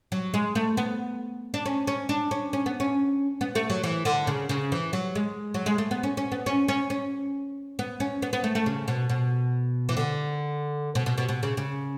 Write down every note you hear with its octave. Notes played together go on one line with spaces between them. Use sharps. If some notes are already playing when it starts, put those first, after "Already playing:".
F#3
G#3
A3
B3
D4
C#4
C#4
D4
C#4
C#4
B3
C#4
B3
A3
F#3
E3
D3
C#3
C#3
E3
F#3
G#3
F#3
G#3
A3
B3
C#4
C#4
B3
C#4
C#4
C#4
B3
C#4
B3
B3
A3
A3
C#3
B2
B2
E3
D3
B2
B2
B2
B2
C#3
C#3